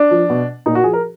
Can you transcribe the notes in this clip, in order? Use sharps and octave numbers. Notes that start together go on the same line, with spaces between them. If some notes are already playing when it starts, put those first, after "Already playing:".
Already playing: D4
F3
B2
A#2 D#4
F#4
F3 G#4
A#4